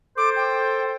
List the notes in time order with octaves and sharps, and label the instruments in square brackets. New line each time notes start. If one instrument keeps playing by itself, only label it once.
[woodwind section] A4 C5 [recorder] D6
[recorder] G5